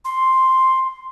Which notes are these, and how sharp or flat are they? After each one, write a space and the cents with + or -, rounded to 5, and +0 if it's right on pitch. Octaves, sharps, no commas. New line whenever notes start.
C6 +5